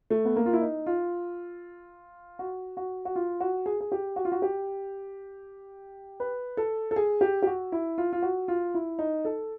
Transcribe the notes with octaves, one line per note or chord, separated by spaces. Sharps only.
A3
B3
A#3
F4
E4
D#4
F4
F#4
F#4
F#4
F4
F#4
G#4
G#4
G4
F#4
F4
F#4
G4
B4
A4
A4
G#4
G4
G4
F#4
E4
F4
F4
F#4
F4
E4
D#4
A4